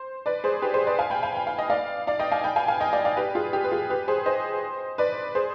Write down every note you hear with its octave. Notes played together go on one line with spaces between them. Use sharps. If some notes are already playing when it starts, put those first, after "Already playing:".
Already playing: C5
B4 D5
G#4 C5
G4 B4
G#4 C5
B4 D5
F5 G#5
G5 B5
F5 G#5
G5
F5
D#5
D5 F5
D5 F5
D#5 G5
F5 G#5
G5 B5
F5 G#5
F5 G#5
D#5 G5
D5 F5
D5 F5
G4 B4
F4 G#4
G4
B4
F4 G#4
G4 B4
G#4 C5
C5 D#5
B4 D5
G#4 C5